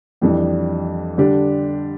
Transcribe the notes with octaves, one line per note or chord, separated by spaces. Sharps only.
F2 E3 G3 D4
D3 G3 D4 G4